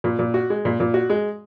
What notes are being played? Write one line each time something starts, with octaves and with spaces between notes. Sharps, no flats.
A#2
A#2
F#4
G#3
A#2
A#2
F#4
G#3